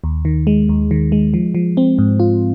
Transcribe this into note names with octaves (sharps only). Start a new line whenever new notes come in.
D#2
D#3
G#3
D#2
D#3
G#3
F3
F3
C4
G#2
F4